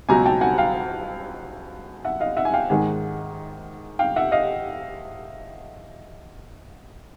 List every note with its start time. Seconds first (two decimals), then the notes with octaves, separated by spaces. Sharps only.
0.09 C#2 B2 F#3 G#5 A#5
0.25 G5 A5
0.41 F#5 G#5
0.58 F5 G5
2.05 E5 F#5
2.20 D#5 F5
2.37 E5 F#5
2.45 G#5
2.54 F5 G5
2.70 G#2 D#3 G#3 F#5 G#5
3.99 F5 G5
4.16 E5 F#5
4.32 D#5 F5